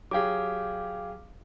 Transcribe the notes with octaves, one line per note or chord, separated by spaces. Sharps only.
F#3 G4 G#4 F5 D6